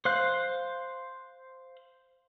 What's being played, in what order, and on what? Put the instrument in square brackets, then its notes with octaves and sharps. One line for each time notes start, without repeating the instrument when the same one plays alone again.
[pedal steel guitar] C5 F5 F#6